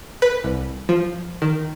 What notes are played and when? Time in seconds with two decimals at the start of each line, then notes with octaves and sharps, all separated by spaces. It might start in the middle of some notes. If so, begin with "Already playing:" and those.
0.22 B4
0.44 C2
0.89 F3
1.42 D#3